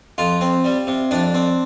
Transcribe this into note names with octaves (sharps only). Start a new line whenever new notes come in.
F2 F4
C4
G3
C3
F2 D4
C4